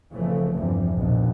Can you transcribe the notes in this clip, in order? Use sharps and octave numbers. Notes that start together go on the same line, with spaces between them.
F1 C#3 E3 F3 A3
E2 G2 C3 E3 F3
A#1 D#2 B2